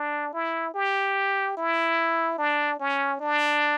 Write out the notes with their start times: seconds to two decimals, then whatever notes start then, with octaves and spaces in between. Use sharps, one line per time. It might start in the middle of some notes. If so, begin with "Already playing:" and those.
Already playing: D4
0.33 E4
0.74 G4
1.57 E4
2.38 D4
2.80 C#4
3.20 D4